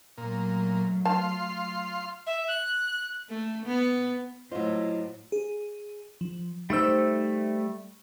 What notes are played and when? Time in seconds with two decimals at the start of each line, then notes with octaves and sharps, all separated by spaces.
0.18 A#2 F#3 A3
1.05 F5 A5 C6
2.26 E5
2.48 F#6
3.29 A3
3.66 B3
4.52 A2 F#3 E4 F4 C5 D#5
5.32 G#4
6.21 F3
6.70 G3 A3 D#4 C5 E6